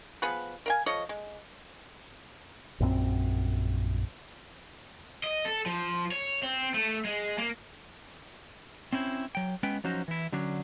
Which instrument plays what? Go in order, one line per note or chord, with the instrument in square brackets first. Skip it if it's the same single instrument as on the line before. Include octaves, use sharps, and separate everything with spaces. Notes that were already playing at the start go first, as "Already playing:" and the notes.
[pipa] F3 B3 G#4 B4
A#4 F5 G#5
F3 A4 C#5 D#5
G#3
[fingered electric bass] A#1 F#2 F3 C4
[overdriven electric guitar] D#5
A4
F3
C#5
C4
A3
G#3
A#3
[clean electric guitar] C4 C#4 E4 C5
F#3 G5
G#3 B3 C#4 B4 G5
F3 F#3 C#4 D#4 F#4 C5
E3 E4
D3 F#3 C#4 D4